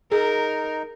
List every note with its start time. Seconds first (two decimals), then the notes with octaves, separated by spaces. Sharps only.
0.11 D#4 G#4 A#4